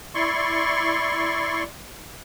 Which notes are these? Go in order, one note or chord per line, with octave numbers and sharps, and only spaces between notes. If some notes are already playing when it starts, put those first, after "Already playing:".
E4 D5 C6 C#6